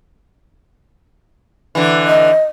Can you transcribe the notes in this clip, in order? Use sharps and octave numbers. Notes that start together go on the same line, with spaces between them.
D3 E3
D#5